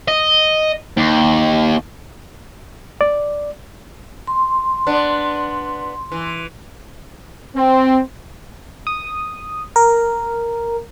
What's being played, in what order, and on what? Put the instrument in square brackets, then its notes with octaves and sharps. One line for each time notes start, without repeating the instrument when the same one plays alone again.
[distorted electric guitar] D#5
D#2
[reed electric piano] D5
[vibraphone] C6
[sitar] B3 D4
E3
[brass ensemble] C4
[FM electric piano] D#6
A#4